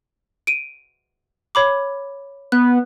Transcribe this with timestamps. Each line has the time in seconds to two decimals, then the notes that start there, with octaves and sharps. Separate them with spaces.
0.47 D7 D#7
1.55 C#5 B5 D6
2.52 B3 F#6